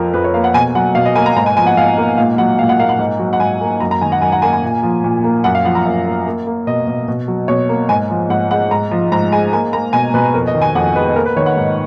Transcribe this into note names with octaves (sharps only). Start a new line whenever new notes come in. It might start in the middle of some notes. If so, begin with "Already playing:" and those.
Already playing: F2 F3 A#4
F2 B4
C#5
A#3 F5
F#5
B2 G#5
F#3 F#5
B2 F5
D#5
A#3 G#5
A#5
G#2 A#5
G#5
F3 G#5
F#5
G#2 F5
A#3
A#2 F5
F#3 F#5
A#2 F5
F#5
A#3 F5
F#5
G#2
F#3
F#5
G#2 G#5
A#3
F#2 A#5
A#5
D#3 G#5
F#5
F#2 G#5
F#5
A#3 G#5
G#5
A#2
F3
A#2
A#3
F#2 F#5
F5
F3 F#5
A#5
F#2
A#3
A#3
A#3
B2 D#5
B2
B2
F#3
B2 C#5
A#3
G#2 G#5
F3
G#2 F#5
G#3 F#5
G#2 A#5
F3
G#2 A#5
G#3 G#5
A#3 G#5
A#3 A#5
B2 G#5
B2 B4
F2 A#4
D#5
D#3
G#5
F2 F#5
G#3 B4
A#3 A#4
B4
D#3 C#5
F#5
G#2